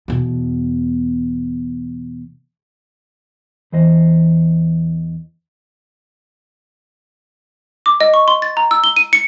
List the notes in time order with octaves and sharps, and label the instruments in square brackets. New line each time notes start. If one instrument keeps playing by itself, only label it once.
[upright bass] E2 B2
[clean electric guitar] E2 E3 C5 D#5
[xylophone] D6
D#5
C#6
C6
A6
A#5
E6
G7
D#7
C#7